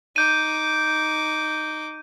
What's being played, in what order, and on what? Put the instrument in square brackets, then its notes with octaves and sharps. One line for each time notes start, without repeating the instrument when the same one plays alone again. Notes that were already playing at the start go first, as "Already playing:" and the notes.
[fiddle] D#4 D6 [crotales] G6 D#7